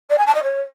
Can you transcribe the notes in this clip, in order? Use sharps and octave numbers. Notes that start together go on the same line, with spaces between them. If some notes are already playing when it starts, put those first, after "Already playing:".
D5
G#5
A5
D#5
C#5